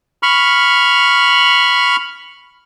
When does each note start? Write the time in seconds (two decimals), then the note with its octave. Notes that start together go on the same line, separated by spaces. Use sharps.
0.23 B5 C#6 F6